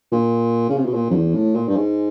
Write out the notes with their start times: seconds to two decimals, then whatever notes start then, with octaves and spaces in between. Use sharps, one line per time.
0.12 A#2
0.69 C#3
0.78 C3
0.85 B2
0.94 A#2
1.10 F2
1.14 E2
1.35 A2
1.55 A#2
1.68 G2
1.76 G#2